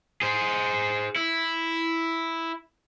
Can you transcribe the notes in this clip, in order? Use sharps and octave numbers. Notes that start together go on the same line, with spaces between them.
G#4 C5
E4